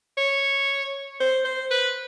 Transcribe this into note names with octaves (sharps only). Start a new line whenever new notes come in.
C#5
C5
C5
B4